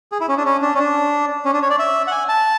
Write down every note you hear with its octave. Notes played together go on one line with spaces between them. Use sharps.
G#4
E4
C#4
D4
C#4
D4
C#4
D4
C#4
D4
C#5
D5
E5
F#5
G#5
A5